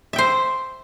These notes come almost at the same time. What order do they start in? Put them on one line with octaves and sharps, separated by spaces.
E5 G5 C5